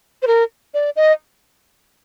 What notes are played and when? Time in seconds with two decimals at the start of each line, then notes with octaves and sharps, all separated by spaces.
0.22 C5
0.27 A#4
0.74 D5
0.96 D#5